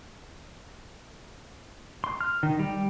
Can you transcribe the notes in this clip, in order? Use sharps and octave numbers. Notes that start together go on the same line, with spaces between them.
C6
F6
D#3
G3